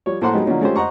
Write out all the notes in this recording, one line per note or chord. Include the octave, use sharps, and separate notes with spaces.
F3 G3 C#5
A2 A#3 A4 C5 F#5 C6
F#3 G#3 B3 D#4 G4
D3 F3 F#3 A#3 C#4 D#4
G#3 A3 C#4 F4 G4 C5
C5 D#5 F#5 A#5 C#6